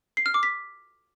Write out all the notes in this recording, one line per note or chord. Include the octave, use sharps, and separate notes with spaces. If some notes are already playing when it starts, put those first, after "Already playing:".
C7
F6
D6
B6